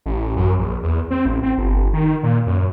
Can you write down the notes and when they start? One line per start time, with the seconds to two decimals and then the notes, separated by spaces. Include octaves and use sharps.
0.06 A1
0.37 F#2
0.59 A#1
0.83 E2
1.11 C4
1.26 A1
1.43 C4
1.58 G1
1.93 D#3
2.23 A#2
2.46 F#2